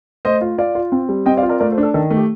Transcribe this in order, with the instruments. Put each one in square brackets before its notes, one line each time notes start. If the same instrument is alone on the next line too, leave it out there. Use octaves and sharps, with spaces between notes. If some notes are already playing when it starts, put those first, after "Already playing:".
[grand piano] A3 [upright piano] C5 D#5
[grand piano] F4
[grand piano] F4 [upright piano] D5 F5
[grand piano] F4
C4
G3
[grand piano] C4 [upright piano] D#5 G5
[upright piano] D5 F5
[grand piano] F4
[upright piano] A#4 D5
[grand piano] A3 [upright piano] A#4 D5
[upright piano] A4 C5
[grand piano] D4
[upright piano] A4
[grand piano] D#3 [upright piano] A4
[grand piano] A3
[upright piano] G4